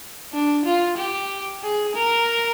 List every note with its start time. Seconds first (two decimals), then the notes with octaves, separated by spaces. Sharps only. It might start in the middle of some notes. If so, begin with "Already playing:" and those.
0.33 D4
0.65 F4
0.97 G4
1.63 G#4
1.95 A#4